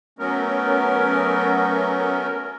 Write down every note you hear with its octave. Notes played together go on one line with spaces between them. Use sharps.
F#3 A3 B3 C#4 A#4